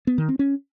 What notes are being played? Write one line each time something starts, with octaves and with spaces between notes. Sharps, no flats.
B3
D#3
C4
C#4